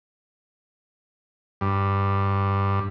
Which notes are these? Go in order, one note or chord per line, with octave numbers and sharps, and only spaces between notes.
G2